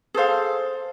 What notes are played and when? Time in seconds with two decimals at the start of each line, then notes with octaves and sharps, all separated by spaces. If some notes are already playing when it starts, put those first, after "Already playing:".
0.14 G#4 A4 C5 F5